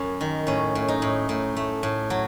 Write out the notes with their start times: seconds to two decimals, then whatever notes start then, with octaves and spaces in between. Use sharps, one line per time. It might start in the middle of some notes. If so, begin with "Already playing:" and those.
Already playing: F#2 C#4 A4
0.21 D#3
0.47 A2 C#4
0.75 A2
0.88 D#4
1.02 A2
1.29 A2
1.57 A3
1.83 A2
2.10 F#3